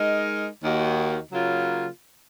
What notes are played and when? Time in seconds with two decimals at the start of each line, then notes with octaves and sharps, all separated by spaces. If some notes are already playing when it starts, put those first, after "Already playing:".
Already playing: G#3 D#4 A#4 D#5
0.61 D#2 D#3 A#3 D#4 F#4
1.31 C#3 F#3 A#3 F4